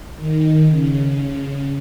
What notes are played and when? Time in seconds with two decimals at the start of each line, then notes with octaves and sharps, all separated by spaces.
0.16 D#3
0.67 C#3